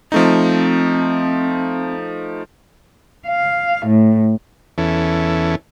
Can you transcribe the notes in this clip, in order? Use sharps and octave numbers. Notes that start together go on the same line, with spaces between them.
F3 A3 C4 D#4
F5
A2
E2 E3 C#4 A4